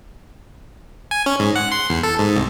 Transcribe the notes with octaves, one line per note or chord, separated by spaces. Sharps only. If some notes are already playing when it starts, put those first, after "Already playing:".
G#5
C#4
G#2
F#5
C6
E2
A4
G#2
C2